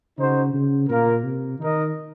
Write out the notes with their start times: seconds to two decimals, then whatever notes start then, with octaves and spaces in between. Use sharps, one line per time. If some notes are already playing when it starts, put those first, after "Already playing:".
0.18 C#3 D#4 F#4 C5
0.54 C#3
0.89 A#2 A#3 F4 A#4
1.24 C3
1.59 D#3 D#4 A#4 D#5